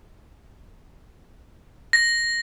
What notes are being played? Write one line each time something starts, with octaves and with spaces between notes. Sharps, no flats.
A#6